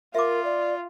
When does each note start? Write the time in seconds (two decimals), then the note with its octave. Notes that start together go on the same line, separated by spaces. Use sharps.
0.15 F4 A#4 E5 D6
0.44 D5